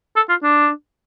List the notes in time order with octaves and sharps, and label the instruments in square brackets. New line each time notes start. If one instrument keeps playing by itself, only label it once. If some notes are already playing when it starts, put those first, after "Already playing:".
[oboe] A4
F4
D4